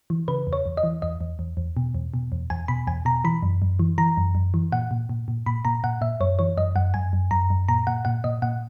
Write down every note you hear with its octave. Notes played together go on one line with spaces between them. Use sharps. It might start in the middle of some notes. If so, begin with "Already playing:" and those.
E3
C#3 B4
E2
C#5
E2
D#5
E3
E2 D#5
E2
E2
E2
B2
E2
B2
E2
E2 G#5
B2 B5
E2 G#5
B2 A#5
E3 B5
F#2
F#2
E3
E3 A#5
F#2
F#2
E3
A#2 F#5
A#2
A#2
A#2
A#2 B5
A#2 A#5
A#2 F#5
A#2 E5
F#2 C#5
E3 C#5
F#2 D#5
F#2 F#5
F#2 G#5
F#2
F#2 A#5
F#2
A#2 A#5
A#2 F#5
A#2 F#5
A#2 D#5
A#2 F#5